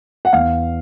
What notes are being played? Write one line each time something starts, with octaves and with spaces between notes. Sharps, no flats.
F#5
E2 F5